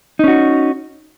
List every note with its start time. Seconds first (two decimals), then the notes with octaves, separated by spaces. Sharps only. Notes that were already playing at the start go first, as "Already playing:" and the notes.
0.19 D#4
0.24 C#4
0.28 F#4